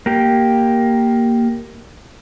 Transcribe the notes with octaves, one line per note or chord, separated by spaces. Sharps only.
A#3 G4